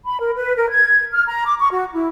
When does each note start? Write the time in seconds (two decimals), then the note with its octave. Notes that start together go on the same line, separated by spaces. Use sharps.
0.04 B5
0.19 A#4
0.36 B4
0.55 A#4
0.68 G#6
1.12 F6
1.26 A#5
1.44 D6
1.59 C#6
1.70 F#4
1.93 E4